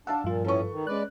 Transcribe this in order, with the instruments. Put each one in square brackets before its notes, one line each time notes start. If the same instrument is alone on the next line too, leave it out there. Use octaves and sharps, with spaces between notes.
[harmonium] D4 [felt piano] F5 A5 E6 [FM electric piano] F#5
[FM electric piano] G2 F3 F4 [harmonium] A#2
[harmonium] A2 C#4 [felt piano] A4 B4 C#6
[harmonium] D#3
[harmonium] G#3 B4 D5 [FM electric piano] C#4 F#6